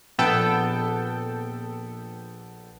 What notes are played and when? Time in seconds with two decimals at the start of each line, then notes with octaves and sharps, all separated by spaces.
0.18 A#1 B3 A4 G5